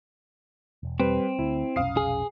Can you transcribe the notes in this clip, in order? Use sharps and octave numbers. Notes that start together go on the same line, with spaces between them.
E1
G3 C4 B4
D2 E4
F1 B1 C#4 F5 D#6 C7
G#4